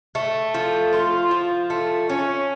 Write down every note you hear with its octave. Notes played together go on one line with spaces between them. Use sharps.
A3
F3
F4
F3
A3
C#4